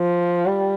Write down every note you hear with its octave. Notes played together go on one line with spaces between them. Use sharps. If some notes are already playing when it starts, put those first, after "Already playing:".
Already playing: F3
G3